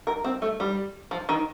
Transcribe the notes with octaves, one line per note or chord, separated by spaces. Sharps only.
A#4
C4
A3
G3
F3
D#3